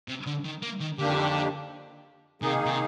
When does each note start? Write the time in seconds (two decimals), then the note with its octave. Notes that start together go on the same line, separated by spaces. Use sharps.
0.08 C3
0.26 D3
0.45 D#3
0.62 A#3
0.80 D#3
0.98 F2 D3 D#3 A#3 D4 G4
2.42 C3 D#3 A#3 D#4 G#4
2.66 C3